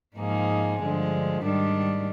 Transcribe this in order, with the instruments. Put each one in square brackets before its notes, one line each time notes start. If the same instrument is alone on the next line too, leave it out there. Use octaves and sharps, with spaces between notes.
[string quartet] G#2 F3 A#3 D#4 G#4
G2 D3 F3 G#3
G#2 D#3 G3 D4